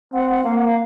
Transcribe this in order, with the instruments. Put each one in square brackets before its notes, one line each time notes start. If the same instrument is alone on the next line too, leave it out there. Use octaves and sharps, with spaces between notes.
[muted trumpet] C4 [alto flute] F#5
[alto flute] F#5
[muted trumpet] A#3 [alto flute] F5
[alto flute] F#5
F5